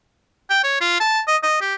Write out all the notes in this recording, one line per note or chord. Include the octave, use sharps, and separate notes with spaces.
G5
C#5
F4
A5
D#5
D#5
G4